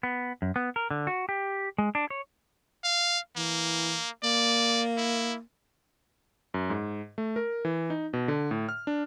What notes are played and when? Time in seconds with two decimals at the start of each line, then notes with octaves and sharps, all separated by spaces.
0.03 B3
0.42 F#2
0.56 B3
0.76 A#4
0.91 D3
1.07 F#4
1.29 G4
1.78 G#3
1.95 D4
2.10 C#5
2.84 F5
3.37 E3 A#3
4.23 A#3 D5
4.98 E4
6.54 F#2
6.70 G#2
7.18 A3
7.36 A#4
7.65 E3
7.90 D#4
8.13 B2
8.28 D3
8.51 A2
8.69 F6
8.87 D4